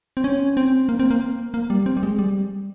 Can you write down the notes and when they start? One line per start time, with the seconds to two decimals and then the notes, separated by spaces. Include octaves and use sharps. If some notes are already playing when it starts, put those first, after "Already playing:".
0.17 C4
0.24 C#4
0.57 C4
0.89 A#3
0.99 C4
1.11 A#3
1.54 A#3
1.70 G3
1.86 C4
1.97 G3
2.03 G#3
2.19 G3